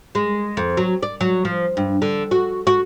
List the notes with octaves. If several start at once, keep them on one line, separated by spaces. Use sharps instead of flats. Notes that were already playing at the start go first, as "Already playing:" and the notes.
G#3
F2
F#3
D5
F#3
F3
G2
D3
F#4
F#4